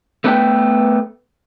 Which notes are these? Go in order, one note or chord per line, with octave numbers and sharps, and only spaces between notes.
A3 B3 C#4 A4 B4 G5